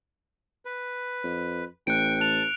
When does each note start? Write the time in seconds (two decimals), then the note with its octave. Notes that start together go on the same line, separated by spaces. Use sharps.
0.65 B4
1.24 F2
1.87 A1 G5 F#6 C#7 D7
2.21 A5 F#6 F7